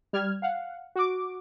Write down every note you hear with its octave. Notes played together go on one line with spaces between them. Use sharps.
G3 F6 G#6
F5 F#5
F#4 D6